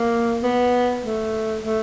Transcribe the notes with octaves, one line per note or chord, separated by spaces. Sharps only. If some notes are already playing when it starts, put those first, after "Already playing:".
Already playing: A#3
B3
A3
A3